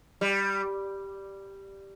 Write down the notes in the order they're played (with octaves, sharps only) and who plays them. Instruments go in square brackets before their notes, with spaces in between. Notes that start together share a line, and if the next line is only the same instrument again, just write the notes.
[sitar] G3